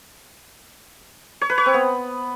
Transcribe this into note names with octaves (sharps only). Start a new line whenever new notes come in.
C#5
B4
C#5
C4
B3